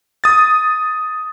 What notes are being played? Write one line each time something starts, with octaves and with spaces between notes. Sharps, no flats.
D#6 A6